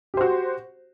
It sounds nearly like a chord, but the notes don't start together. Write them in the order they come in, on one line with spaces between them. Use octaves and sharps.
G4 C5 F#4